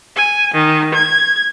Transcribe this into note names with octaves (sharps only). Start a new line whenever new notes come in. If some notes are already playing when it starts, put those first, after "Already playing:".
G#5
D#3
G#6